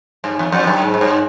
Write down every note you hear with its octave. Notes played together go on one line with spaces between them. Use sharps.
G2
E2
F2
F#2
G#2
F#2
G2